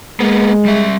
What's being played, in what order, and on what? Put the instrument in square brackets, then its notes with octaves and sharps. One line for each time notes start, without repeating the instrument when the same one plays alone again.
[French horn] G#3 [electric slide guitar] A#3 B3
[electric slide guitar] G3 E5